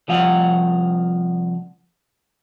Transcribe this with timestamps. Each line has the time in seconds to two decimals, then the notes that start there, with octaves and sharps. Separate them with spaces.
0.08 C2 F3 F5 F#5